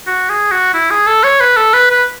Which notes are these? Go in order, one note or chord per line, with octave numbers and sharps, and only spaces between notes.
F#4
G#4
F#4
E4
G#4
A4
C#5
B4
A4
B4
B4